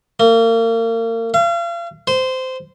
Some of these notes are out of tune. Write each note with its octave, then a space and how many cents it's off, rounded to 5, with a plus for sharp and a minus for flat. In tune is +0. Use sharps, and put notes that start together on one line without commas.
A#3 -35
F5 -35
C5 -15